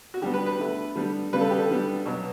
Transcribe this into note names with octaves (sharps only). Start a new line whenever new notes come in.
F#4
D3 G3 B3 G4
B4
B4
D3 A3
D3 G3 B3
C#3 G3 B3 B4
A4
G4
A4
D3 G3 B3
B2 F#3 B3